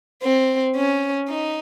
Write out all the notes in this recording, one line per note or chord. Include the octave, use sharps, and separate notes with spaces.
C4
C#4
D#4